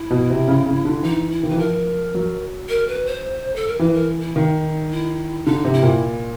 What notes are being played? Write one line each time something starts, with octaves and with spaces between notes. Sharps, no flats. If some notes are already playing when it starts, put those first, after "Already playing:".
Already playing: E4
B2
C3
C#3
C#3
D3
E3 D#4
E4
D#3
E3 B4
F3 A#4
F#3
A#4
B4
C5
A4
A#4
E3 B4
A#4
E4
D#3 D#4
E4
D3 D#4
C3
E4
A#2